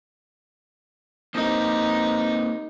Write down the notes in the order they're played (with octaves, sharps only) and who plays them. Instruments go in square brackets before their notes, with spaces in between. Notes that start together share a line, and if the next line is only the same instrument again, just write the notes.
[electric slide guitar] A#3 C4 [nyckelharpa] D#4 G4